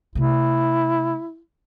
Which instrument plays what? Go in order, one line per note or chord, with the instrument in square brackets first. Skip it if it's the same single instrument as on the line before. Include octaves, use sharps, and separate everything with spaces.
[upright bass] C3 A3 [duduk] E4